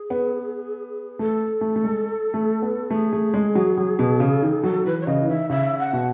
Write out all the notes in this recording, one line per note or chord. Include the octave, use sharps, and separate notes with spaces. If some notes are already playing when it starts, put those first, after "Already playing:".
Already playing: G#4
B3
A3 A4
A3
A3
G#3
A3
B3
A3 G#4
A3
G#3
F#3
F#3
B2
C#3
D#3
F#3 A4
E3 B4
C#5
C#3 D#5
E3
D#3 E5
C#3 E5
F#5
B2